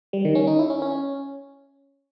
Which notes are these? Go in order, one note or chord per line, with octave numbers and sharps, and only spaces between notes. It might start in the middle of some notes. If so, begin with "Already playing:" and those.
G3
D#3
C#4
D#4
E4
C#4
C#4